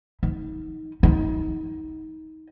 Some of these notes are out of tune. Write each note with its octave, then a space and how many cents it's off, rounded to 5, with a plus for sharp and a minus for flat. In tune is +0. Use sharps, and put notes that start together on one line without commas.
D#4 +15
D#4 +20